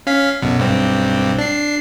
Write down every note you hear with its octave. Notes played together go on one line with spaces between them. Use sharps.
C#4 F5 B6
B1 F#2 B2
B1 G2 C4
D4 C7